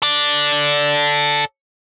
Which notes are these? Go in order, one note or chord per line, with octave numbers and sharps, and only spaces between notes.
A4 D5